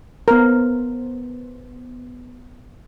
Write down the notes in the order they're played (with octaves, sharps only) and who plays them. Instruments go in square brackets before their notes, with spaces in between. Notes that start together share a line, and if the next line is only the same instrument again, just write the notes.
[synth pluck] B3 C5 [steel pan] A#4